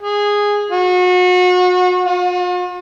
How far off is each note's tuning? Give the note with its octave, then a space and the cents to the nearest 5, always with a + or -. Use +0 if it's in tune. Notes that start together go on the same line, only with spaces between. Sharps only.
G#4 -10
F#4 -35
F4 +45